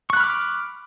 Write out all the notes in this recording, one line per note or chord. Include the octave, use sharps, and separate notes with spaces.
B5 C#6 D6 F6 F#6